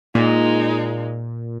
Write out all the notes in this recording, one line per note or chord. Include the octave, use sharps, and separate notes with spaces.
A#2 G#3 D#4